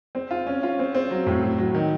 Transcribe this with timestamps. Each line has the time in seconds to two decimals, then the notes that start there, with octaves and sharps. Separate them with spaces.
0.15 C4
0.31 F4
0.47 C#4
0.63 F4
0.79 C4
0.95 C4
1.11 F#3
1.26 A2
1.43 F#3
1.58 F#3
1.75 D#3